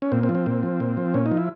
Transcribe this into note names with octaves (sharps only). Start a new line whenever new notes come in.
C#4
A#2 C4
C4
F3
C4
A#2
F3
A#2
F3
A#2 C#4
D#4
F3
E4